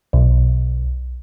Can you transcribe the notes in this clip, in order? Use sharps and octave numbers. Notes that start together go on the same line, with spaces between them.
B1